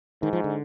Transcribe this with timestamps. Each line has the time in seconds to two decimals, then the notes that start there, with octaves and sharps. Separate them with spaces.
0.22 G#2 D#3
0.33 F3
0.44 D3